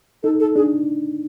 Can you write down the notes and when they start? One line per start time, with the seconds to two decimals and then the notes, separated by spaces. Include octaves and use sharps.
0.23 D#4 A4
0.40 A4
0.56 D4 G#4